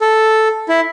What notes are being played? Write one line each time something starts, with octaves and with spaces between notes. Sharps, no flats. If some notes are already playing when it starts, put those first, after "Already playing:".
A4
E4